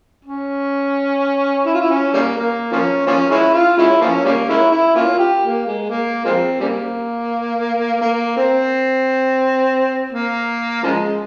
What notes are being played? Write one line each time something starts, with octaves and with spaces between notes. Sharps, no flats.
C#4
E4
F4
E4
C#4
C#3 G3 A#3
A#3
F3 A#3 C#4
F3 A#3 C#4
G#3 C#4 E4
F4
G#3 C#4 E4
F3 A#3 C#4
C#3 G3 A#3
G#3 C#4 E4
E4
A#3 C#4 F4
G4
A#3
G#3
A#3
F3 G#3 C4
C#3 G3 A#3
A#3
C4
A#3
C#3 F3 G#3